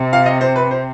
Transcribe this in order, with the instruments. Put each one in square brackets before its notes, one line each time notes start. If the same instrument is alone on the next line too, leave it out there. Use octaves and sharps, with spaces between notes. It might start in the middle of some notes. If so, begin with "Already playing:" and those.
Already playing: [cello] C3
[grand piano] F5
D#5
C5
B4
C5